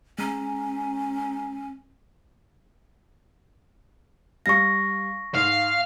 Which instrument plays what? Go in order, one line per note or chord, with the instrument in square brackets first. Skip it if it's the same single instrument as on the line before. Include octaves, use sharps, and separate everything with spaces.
[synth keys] G#3 A#5 [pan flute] C#4
[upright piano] G3 F5 [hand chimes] C#6 A#6
[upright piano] G#2 [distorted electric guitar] F5